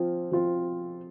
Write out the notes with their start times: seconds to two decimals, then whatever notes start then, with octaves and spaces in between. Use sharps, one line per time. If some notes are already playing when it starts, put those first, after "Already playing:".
Already playing: F3 C4 F4
0.32 F3 C4 F4